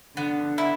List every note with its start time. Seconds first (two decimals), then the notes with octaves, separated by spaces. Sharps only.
0.16 D3 B3
0.58 E4